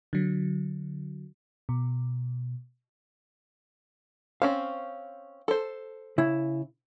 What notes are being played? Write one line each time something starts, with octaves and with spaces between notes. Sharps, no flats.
D3 F#3
B2
C4 C#4 C5 F5
A4 C5
C#3 E4